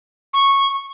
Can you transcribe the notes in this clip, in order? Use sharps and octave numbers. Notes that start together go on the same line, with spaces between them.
C#6